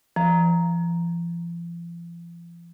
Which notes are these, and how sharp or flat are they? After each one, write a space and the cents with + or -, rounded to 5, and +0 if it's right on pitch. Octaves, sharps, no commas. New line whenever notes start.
F3 -45 A#5 +0